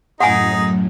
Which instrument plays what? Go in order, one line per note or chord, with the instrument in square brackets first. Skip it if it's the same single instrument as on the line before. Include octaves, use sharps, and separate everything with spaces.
[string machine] F#2 A2 [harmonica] D#4 G#4 [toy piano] F#5 G#5